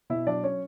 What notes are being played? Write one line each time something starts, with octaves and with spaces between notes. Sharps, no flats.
B2 E4 E5
F#3 D4 D5
C#4 C#5